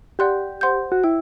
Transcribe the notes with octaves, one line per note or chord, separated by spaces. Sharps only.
G4 D5 F#5 C6 F#6
C5 F#5 C6 G6
F#4
E4 G5